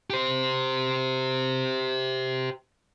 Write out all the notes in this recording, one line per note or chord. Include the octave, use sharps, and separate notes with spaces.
G4 C5